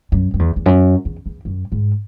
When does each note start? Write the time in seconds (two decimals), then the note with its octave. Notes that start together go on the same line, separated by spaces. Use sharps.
0.12 F#2
0.34 F#2
0.39 E2
0.56 E2
0.66 F#2
1.05 E2
1.26 E2
1.45 F#2
1.72 G#2